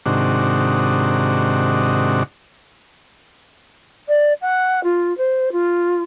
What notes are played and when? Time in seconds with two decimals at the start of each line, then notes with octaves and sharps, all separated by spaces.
0.06 G#2 C3 D#3 D4 F#4
4.08 D5
4.41 F#5
4.83 F4
5.17 C5
5.52 F4